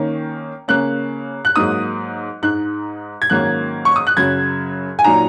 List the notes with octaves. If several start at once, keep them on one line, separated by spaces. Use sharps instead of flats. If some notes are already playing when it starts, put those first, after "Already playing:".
Already playing: D#3 A#3 C#4
C#3 A#3 C#4 F#6
F#6
G#2 F#3 A#3 D#4 D#6
G#2 G#3 D#4 F#6
G#6
G#2 D#3 F#3 A#3 C#4 F#6
C#6
D#6
F#6
F#2 C#3 F#3 G#6
G#5
A#2 F#3 D#4 A#5